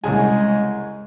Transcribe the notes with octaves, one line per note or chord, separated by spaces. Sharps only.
C2 C#3 G#3 G#4 G#5